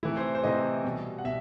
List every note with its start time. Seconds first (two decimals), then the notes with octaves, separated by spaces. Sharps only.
0.03 C3 E3 A3 E4
0.17 C5
0.35 C5
0.43 C3 E3 A3 D#5
0.84 B2 G3
1.18 F#5
1.24 B2 E5